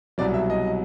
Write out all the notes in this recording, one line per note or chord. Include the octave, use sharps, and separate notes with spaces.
C2 B2 F#3 D5
E5
D#5